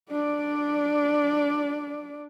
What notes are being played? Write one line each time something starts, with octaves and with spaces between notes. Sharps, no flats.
D4 D5